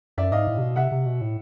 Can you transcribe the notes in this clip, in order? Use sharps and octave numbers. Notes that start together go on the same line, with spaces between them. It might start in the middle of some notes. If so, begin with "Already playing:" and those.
F#2 D5 E5
G#2 D#5 F5
A2
C3
B2
C3 E5 F#5
C3
B2
A2